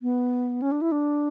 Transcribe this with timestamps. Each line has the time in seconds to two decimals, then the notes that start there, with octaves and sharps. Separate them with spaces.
0.02 B3
0.62 C#4
0.72 D4
0.81 E4
0.92 D4